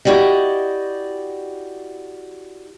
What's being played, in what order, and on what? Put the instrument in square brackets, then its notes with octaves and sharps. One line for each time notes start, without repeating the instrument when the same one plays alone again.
[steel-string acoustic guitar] E4 F#4 G4 D5 D#5